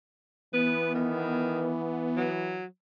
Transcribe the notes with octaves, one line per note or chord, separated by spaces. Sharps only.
E3 B3 B4
D#3
F#3